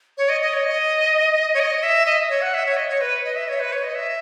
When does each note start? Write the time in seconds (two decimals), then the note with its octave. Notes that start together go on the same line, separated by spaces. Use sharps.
0.18 C#5
0.29 D#5
0.42 D#5
0.53 C#5
0.65 D#5
1.54 C#5
1.60 D#5
1.83 E5
2.06 D#5
2.29 C#5
2.41 F#5
2.54 E5
2.66 C#5
2.77 D#5
2.89 C#5
3.01 B4
3.25 D#5
3.36 E5
3.48 C#5
3.60 B4
3.72 C#5
3.83 D#5
3.95 E5